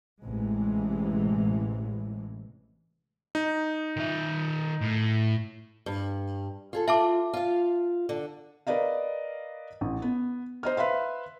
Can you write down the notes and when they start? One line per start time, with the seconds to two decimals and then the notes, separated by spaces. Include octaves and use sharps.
0.25 A1 C3 E3 G#3
3.35 D#4
3.97 D#3 E5
4.81 A2
5.86 G2
6.73 F4 G#4 A4
6.88 F4 E5 A5 D6
7.34 F4 F5
8.09 D3
8.67 A#4 B4 D5 D#5 F5
9.81 A1
10.02 B3
10.63 C5 D#5 F6
10.77 B4 E5 F5 C6